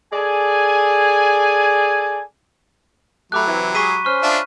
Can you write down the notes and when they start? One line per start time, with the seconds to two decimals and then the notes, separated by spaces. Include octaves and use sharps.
0.13 G#4 A4 D5 G#5
3.32 F#3 A3 G4 B5 D6 F#6
3.47 C3 E3
3.75 G#3 G4 G#4 C#6 B6 D#7
4.05 C#4 C5 C#6 F6
4.22 D4 F4 E5